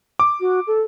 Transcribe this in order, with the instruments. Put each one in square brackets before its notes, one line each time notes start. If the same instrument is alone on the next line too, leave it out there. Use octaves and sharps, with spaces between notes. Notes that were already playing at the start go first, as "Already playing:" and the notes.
[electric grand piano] D6
[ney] F#4
A4